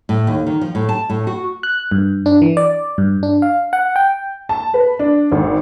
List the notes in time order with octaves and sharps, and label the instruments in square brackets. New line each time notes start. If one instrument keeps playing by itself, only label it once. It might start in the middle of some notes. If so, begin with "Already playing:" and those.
[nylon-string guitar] A2
D#2
D#3
F3
A2
A5
A2
F#4
[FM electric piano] F#6
G2
D4
E3
D5
G2
D4
F5
F#5
G5
[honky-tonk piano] A5
B4
D4
G#1